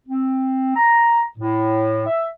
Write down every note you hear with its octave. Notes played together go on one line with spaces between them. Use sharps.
C4
A#5
A2
E5